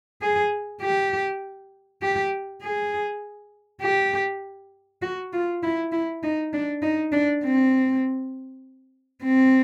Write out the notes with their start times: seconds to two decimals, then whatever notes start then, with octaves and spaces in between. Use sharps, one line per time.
0.22 G#4
0.82 G4
2.02 G4
2.63 G#4
3.82 G4
5.02 F#4
5.33 F4
5.63 E4
5.92 E4
6.23 D#4
6.53 D4
6.82 D#4
7.13 D4
7.43 C4
9.23 C4